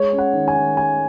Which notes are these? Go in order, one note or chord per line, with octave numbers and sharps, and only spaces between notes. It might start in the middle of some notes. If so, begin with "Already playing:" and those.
Already playing: G#3 C#5
C#4
F#5
D#3
G#5
D#3
G#3 G#5